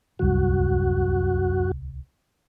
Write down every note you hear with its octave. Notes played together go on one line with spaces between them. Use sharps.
D1 C2 F#2 G3 F#4